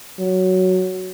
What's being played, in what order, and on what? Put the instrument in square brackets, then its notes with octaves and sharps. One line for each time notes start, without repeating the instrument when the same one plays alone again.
[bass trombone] F#3